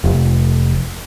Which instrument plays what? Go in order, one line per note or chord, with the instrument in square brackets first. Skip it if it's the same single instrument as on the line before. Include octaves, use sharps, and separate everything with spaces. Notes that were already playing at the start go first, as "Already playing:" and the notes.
[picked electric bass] F1